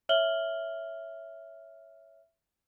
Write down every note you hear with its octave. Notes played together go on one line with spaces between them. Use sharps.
C#5 E5 F6 F#7 G7